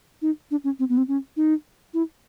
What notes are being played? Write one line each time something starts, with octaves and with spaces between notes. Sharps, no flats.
D#4
D4
C#4
C4
B3
C4
C#4
D#4
E4